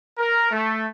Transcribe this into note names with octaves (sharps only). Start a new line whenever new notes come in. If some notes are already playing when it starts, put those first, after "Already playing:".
A#4
A3